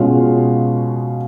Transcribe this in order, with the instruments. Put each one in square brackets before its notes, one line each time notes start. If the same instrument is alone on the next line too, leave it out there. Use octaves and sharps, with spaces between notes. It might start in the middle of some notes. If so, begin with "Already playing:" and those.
Already playing: [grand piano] B2 G#3 C#4 F4 F5